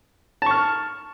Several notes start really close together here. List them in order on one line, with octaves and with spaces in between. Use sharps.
A5 C#6 F6